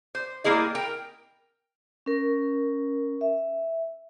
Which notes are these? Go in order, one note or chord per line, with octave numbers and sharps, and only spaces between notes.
C5
G3 A#3 E4 G#4 D#5
A#4 G5
C#4 A#4
E5